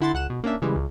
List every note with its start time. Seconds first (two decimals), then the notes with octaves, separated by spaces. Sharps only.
0.01 D3 E4 F#5 C6 A6
0.14 C#2 F#5 F#6 E7
0.30 B2
0.44 A#3 C#4 D4 E5
0.62 C#3 E3 G3 G#3
0.76 C#2